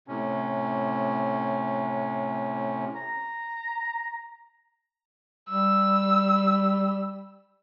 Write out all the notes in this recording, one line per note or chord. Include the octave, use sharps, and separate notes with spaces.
A2 C3 C#4
A#5
G3 E6